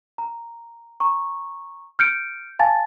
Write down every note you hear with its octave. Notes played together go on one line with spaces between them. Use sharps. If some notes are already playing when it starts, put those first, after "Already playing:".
A#5
A#5 C#6
F6 G6 C#7 D7
F5 G#5 A5 A6